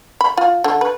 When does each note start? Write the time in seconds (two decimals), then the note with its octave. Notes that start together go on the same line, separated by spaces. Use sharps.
0.21 B5
0.37 F4
0.64 D3
0.81 B4